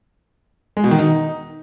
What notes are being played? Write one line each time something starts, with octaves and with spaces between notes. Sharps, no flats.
G#3
B2
D#3
D#4